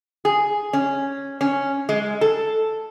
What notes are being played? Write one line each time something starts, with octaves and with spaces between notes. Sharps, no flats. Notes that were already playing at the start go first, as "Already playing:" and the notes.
G#4
C#4
C#4
G#3
A4